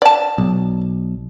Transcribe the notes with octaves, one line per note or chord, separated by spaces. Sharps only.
D5 A5
B1